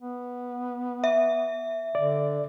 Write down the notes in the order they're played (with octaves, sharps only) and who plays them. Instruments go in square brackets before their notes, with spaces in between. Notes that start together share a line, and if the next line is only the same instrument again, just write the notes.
[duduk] B3
[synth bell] E5
[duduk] D3 [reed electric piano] D5